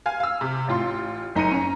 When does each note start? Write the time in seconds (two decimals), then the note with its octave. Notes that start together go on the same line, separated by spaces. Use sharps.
0.06 F5 G#5 F6
0.20 F5 E6
0.41 C3
0.68 A1 F4 C6
1.35 F#1 D#4 A#5 C#7 D#7
1.51 C#4 A#5